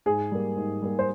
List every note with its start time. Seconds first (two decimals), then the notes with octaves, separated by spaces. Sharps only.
0.06 G#2 G#4
0.32 G3 A#3
0.56 G#2
0.82 G3 A#3
0.99 C5